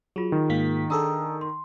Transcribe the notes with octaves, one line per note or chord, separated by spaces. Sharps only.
F#3 F4 G#4
D#3
G#2 A#3 B6
D4 G#4 A4 A#5 D#6 E6
C6